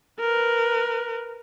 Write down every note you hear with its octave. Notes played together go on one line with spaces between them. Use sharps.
A#4 B4